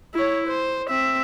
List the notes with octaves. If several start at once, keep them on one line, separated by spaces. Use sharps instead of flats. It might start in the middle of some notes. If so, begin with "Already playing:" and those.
E4 C#5
C5
C4 E5